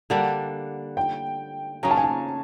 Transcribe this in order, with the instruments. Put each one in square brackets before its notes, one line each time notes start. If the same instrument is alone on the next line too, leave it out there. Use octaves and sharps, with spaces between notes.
[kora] D3 G3 A#3 D4 [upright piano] F#5
[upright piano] G5
[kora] C#3 F#3 A#3 C#4 [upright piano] A#5
[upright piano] A5
G#5
A5